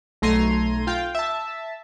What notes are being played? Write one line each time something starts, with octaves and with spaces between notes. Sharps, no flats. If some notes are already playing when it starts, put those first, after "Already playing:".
B1 A3 A#5 C6 G#6 D#7
F4 F5 G5
E5 A5